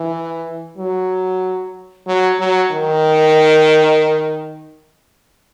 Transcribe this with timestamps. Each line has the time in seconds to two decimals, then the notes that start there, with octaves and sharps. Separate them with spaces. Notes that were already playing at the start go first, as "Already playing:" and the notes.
Already playing: E3
0.78 F#3
2.07 F#3
2.40 F#3
2.72 D#3